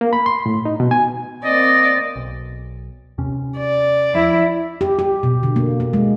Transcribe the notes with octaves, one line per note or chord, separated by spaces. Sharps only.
A#3
B5
C6
A2
D#4
B2
G#5
A#3 C4 D5 D#5
B1
D#2 C3 C#4
D5
F3 E4
G4
G4
B2
D3
A#3
A#3
G#3